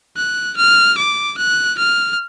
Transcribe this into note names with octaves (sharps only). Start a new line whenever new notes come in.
F#6
F6
D6
F#6
F6